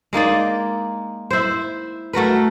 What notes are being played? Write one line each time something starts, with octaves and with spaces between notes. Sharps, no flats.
G#3 A#3 D#4 D5
E4 C5
A3 F#4 A#4 B4